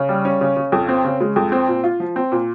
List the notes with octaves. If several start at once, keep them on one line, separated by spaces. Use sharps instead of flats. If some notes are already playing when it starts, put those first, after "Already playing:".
Already playing: C#3
G3
C#4
C#3
C#3
F2
C4
C#3
G#3
F2
C4
A#2
F4
F3
C4
A#2